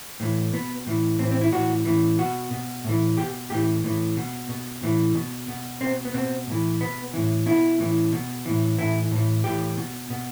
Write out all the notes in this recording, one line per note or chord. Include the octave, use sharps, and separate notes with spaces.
A2 E3
B2 B3
A2 E3
A2 E3 C4
C4
E4
A2 E3 F#4
A2 E3
B2 F#4
B2
A2 E3
B2 G4
A2 E3 G4
A2 E3
B2
B2
A2 E3
B2
B2
B2 C4
B3
B2 C4
A2 E3
B2 B3
A2 E3
B2 E4
A2 E3
B2
A2 E3
A2 E3 E4
A2 E3
A2 E3 G4
B2
B2